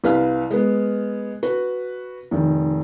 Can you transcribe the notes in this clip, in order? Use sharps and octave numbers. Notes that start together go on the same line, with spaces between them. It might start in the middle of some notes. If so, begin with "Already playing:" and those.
C2 B4 F5 F6
G#3 B3
F#4 B4
F1 D#3